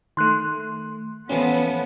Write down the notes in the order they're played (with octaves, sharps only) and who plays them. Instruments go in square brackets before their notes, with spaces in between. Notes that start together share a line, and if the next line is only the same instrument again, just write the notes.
[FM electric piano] D#3 A3 [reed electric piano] C6 F#6
[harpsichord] A2 E3 F3 [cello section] B3 [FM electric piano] C#4